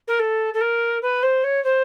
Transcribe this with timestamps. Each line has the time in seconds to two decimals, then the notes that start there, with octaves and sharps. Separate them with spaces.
0.07 A#4
0.19 A4
0.54 A4
0.61 A#4
1.02 B4
1.22 C5
1.43 C#5
1.64 C5